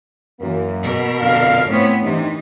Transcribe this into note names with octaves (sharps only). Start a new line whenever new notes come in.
F#2 E3 A#3
B2 A#4
F2 D3 F5
A2 B3 C4 C#5
G2 C3 D#3 E3 D#4